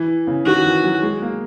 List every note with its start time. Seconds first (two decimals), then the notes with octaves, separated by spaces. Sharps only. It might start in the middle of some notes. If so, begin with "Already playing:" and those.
Already playing: E3
0.27 C#3
0.45 D#3 F#4
0.65 E3
0.84 F#3
1.03 G#3
1.22 A#3